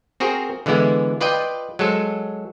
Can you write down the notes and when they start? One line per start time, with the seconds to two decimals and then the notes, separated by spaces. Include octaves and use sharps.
0.20 C4 F#4 G#4 A#4 C5
0.66 D3 E3 G#3 B3 E4
1.21 F4 B4 D5 D#5 G5
1.79 F#3 G#3 A4 C5